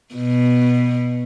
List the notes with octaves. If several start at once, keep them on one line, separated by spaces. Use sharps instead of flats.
B2